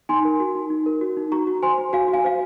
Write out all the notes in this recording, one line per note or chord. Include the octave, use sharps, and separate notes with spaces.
D#4 G#5 C6
A#4
F#4
D#4
D#4
A#4
F#4
D#4
F#4 A#5 C#6
F#4
C5 G#5 C6
C5
F#4 F5 G#5
F#4
F5 G#5
C5 F5